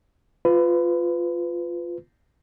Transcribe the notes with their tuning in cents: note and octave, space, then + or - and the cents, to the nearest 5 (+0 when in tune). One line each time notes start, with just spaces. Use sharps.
F4 +0 B4 +25